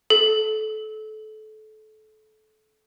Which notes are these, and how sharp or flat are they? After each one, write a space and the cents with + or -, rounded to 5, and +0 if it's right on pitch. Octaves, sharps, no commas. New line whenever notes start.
A4 -25